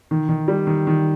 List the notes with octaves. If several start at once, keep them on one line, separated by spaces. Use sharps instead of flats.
D#3
D#3
G3
D#3
D#3